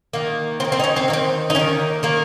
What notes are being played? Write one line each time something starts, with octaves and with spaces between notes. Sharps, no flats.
D#3 A#3
D#3 A#3 C4
C4
D#4
C#4
C4
D#3 A#3
C4
D#4
D#3 A#3 C#4
D#3 A#3